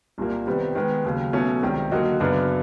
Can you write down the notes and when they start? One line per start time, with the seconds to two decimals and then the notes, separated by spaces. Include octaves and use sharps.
0.18 C2 A#2 G3 A#3
0.47 C3 D#3 G3 B3
0.75 D#3 G#3 B3
1.05 D#2 C#3 F#3
1.33 B2 F#3 A3 C#4
1.62 C#2 C3 D#3 G3
1.91 D3 F#3 A#3 D#4 F#4
2.20 F#2 C#3 F#3 B3 D4